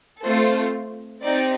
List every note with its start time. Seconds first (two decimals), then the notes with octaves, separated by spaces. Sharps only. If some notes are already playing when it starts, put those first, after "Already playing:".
0.22 A3 C4 F4 A4 C5
1.23 C4 D#4 G4 D5